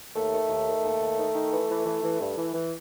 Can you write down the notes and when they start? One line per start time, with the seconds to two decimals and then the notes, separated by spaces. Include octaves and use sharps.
0.15 D#2 A3
0.31 D#3
0.49 D#2
0.66 D#3
0.84 D#2
1.00 D#2
1.17 D#3
1.34 D#3
1.52 E3
1.70 E3
1.86 E3
2.03 E3
2.21 G2
2.37 E3
2.54 E3